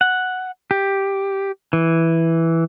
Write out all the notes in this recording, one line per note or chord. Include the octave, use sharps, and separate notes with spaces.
F#5
G4
E3